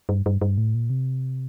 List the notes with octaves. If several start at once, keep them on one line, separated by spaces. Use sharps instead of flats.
G2
G2
G2
A2
A#2
C3